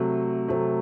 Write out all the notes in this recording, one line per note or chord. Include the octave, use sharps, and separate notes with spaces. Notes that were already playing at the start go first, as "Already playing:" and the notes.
Already playing: C3 F#3 A3
C3 F#3 A3